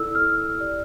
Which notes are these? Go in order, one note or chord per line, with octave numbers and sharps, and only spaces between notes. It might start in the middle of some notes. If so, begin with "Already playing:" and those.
Already playing: E4 A4 D5 E6
F6
G4 D5